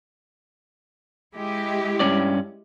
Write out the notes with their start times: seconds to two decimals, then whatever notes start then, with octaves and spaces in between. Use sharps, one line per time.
1.35 G#3 E4 G4
2.00 G2 C#4 D5